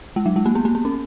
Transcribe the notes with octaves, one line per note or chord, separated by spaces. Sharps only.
G#3
F#3
G#3
A#3
B3
A#3
B3
C#4